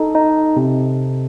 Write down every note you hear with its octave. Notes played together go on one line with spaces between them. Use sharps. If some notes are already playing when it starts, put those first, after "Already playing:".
Already playing: D#4 A4
D#4
C3